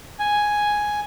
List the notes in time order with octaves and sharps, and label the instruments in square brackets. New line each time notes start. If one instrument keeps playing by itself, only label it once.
[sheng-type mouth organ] G#5